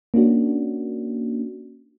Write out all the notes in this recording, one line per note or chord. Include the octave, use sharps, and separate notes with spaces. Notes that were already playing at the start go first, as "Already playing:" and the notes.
A#3 C#4 D4 F#4